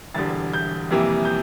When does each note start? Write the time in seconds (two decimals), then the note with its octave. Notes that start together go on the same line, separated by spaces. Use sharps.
0.14 E1 E2 D3 G3 A6
0.53 G6
0.91 F2 C3 E3 G3 A#3
1.25 G6